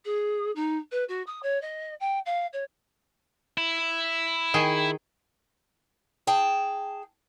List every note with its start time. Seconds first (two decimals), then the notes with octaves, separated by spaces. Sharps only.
0.05 G#4
0.55 D#4
0.92 B4
1.08 F#4
1.27 D#6
1.43 C#5
1.62 D#5
2.00 G5
2.26 F5
2.53 C#5
3.58 E4
4.54 D#3 G#4 G5
6.27 G#4 G5 A5